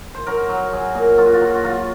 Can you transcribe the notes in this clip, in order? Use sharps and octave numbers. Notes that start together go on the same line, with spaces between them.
C5
F#3 A#4
F#3
F#3 G#4
A#2
F#3 F4
F#4
F4
F#3
F#4
F#3 F4